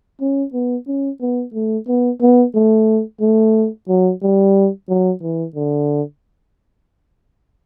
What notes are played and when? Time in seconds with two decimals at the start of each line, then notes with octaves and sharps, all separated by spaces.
0.21 C#4
0.53 B3
0.87 C#4
1.21 B3
1.54 A3
1.87 B3
2.21 B3
2.55 A3
3.21 A3
3.88 F#3
4.22 G3
4.89 F#3
5.22 E3
5.55 D3